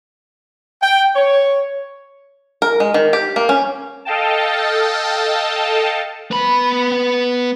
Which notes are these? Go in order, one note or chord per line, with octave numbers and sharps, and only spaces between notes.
G5
C#5
A#4
G#3
D#3
G4
A#3
C#4
A4 D#5 F5 G5 A5
B3 B5